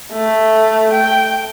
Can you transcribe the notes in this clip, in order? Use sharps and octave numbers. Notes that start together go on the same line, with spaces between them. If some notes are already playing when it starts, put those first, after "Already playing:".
A3
G5